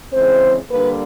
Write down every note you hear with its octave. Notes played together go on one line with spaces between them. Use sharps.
C#3 E3 G#3 C4 C5
D3 G3 A#3 B4